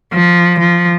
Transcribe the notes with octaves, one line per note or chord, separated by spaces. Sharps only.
F3
F3